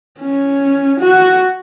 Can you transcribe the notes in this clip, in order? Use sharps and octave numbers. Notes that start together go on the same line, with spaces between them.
C#4
F#4